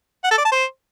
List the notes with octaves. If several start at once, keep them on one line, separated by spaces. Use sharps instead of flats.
F#5
A4
D5
A5
C5